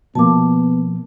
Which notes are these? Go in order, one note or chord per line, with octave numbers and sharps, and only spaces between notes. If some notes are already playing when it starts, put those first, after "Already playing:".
B2 F3 A#3 B3 A5 D6